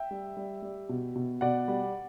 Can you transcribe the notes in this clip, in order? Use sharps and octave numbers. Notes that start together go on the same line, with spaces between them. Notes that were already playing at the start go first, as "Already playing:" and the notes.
Already playing: E5 G5
G3
G3
G3
B2
B2
B2 D5 F#5
G3